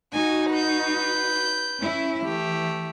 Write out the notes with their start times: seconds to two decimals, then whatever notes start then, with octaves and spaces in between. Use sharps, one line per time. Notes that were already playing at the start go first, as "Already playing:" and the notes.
0.14 D#4 F#4 G#5
0.51 B4 G6
1.80 C#4 E4
2.24 E3 A3 G4